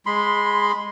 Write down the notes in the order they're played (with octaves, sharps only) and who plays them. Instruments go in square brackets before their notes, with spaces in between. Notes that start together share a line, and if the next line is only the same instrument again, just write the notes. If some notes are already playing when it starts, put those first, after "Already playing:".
[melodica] G#3 B5 C6